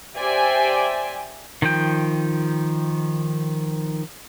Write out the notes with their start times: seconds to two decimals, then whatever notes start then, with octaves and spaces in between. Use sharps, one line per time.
0.17 G4 C5 D5 E5 G5 G#5
1.62 D#3 F3 G5